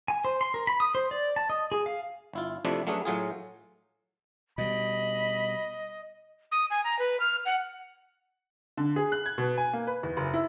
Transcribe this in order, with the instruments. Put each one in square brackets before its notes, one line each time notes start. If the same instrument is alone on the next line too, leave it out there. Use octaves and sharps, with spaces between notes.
[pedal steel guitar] G#5
C5
C6
A#4
B5
D#6
C5
D5
A5
D#5
G#4
F5
[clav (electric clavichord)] G1 E4 F4
F2 C3 F3 A3 D4 E4
F#3 A3 C#4 D4 G#4 B4
A2 F#3 F4 G#4
[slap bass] B2 G3 [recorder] D#5 [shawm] B5
[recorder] D#6
G#5
A#5
B4
F6
F#5
[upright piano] D3
G#4
F#6
G#6
B2
G#5
A#3
B4
E2
F#1
E4